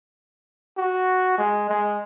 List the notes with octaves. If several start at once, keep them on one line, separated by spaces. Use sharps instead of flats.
F#4
G#3
G#3